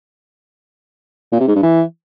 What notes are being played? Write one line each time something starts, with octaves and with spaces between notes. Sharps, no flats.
A#2
C3
G#2
G2
E3